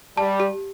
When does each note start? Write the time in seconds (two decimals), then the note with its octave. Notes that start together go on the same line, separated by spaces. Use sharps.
0.17 G3 A5
0.40 G4